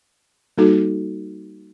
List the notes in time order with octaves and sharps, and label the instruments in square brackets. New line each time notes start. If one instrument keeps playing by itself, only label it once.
[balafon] G3 A#3 D#4 F#4 A4